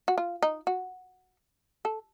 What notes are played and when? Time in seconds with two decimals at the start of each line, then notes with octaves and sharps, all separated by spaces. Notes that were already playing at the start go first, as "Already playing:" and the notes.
0.08 F#4
0.18 F4
0.43 D#4
0.67 F#4
1.85 A4